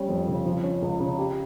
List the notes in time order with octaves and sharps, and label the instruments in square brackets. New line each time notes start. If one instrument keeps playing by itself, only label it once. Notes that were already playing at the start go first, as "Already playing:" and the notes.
Already playing: [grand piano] G3 C#4
F2
C#3
F3
C#4
C#2
C#3
G4